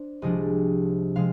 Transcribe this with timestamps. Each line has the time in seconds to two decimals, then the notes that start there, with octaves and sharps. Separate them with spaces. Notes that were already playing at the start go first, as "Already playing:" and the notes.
Already playing: D4 C5 D5
0.22 C2 C3 F3 G#3 D4 D#5
1.16 C3 F3 G#3 F5